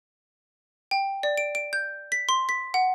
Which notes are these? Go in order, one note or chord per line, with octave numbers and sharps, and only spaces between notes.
G5
D5
D7
D7
G6
B6
C6
B6
F#5